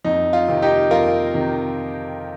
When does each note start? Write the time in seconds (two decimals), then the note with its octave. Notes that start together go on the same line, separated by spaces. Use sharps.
0.04 F2 D#4
0.33 F4
0.48 C3 D#3
0.62 D#4 G4
0.91 F2 F4 A#4
1.34 C3 D#3